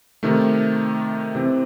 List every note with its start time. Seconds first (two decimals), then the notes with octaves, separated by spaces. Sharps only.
0.23 C3 D#3 A3
1.35 C3 E3 C4